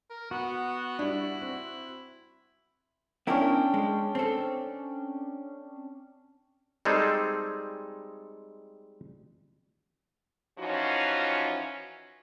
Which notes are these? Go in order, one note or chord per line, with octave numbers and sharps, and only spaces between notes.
A#4
B3 F#4
G3 D4 E4
C4
B3 C#4 D4 E4 A#4 G5
G#3
C4 A4
G3 G#3 C4 D#4 G#4 A4
E3 F3 C#4 D#4 F4 F#4